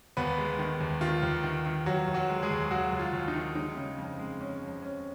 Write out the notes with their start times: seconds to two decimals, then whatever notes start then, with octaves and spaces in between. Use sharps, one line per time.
0.17 D#2 B3 B4
0.38 G#3
0.59 D#3
0.80 D#2
1.01 D#3 F4
1.23 D#2
1.44 D#3
1.65 D#3
1.86 D#2 F#3 F#4
2.08 D#2
2.14 F#3 F#4
2.29 G#3
2.43 G#3 G#4
2.50 D#2
2.71 D#2 F#3 F#4
2.92 D#2
2.99 F4
3.13 D#2
3.28 D#4
3.35 D#3
3.55 G#3 D#4
3.77 C#3
3.98 F2
4.19 G#3
4.41 C#4
4.62 F2
4.83 C#4